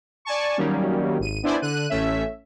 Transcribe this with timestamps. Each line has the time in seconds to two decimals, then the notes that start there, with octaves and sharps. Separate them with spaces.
0.25 D5 G#5 A5 C#6
0.57 D#3 F#3 G3 A#3 C#4
1.19 G#1 D#7
1.43 B3 D4 E4 C5 D5 G#5
1.62 D3 F#6 D#7
1.90 A1 A3 C#4 E5